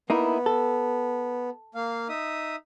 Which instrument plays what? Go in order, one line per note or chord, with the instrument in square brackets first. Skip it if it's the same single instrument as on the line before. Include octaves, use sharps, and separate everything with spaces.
[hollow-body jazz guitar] A#3 D#4 E4 [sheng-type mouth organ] B3
[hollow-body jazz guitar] A4
[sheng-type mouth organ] A#3 F5
D#4 E5 D#6